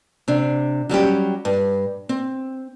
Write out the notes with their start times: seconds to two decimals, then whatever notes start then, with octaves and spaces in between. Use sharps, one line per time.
0.28 C3 D4
0.89 F#3 G3 C#4 G4
1.45 G2
2.09 C4